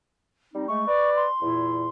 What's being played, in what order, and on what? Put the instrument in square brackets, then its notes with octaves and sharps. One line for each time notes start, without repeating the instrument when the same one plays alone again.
[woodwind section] G3 C4 D#4
[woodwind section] G#3 A3 [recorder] C#6
[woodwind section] B4 D5
[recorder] C6
[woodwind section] E2 A#2 E4